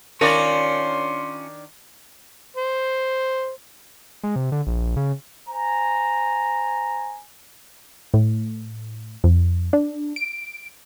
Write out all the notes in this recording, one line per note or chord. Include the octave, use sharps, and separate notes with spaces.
D#3 C#4 D4 F4 A#4 C#5 D5 C6
C5
G#3
C3
D3
A#1
C#3
C5 G#5 A#5
A2
F2
D4
D7